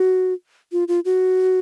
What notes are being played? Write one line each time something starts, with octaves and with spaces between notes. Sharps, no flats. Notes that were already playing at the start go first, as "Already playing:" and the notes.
Already playing: F#4
F4
F4
F#4